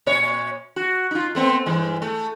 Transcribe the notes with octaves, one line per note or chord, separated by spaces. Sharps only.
A#2 C#5
F#4
D#4 F4
A3 B3 C4
G2 E3 G#3
A3